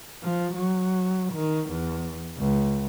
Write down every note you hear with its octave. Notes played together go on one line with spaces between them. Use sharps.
F3
F#3
D#3
E2
C#2